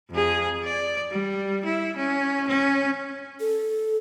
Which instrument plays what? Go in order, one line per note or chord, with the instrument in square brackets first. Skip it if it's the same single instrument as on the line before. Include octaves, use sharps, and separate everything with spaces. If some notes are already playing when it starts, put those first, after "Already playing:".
[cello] F2 G#4
D5
G3
E4
C#4
C#4
[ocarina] A4